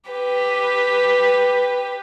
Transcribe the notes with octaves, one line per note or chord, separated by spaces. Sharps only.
G4 B4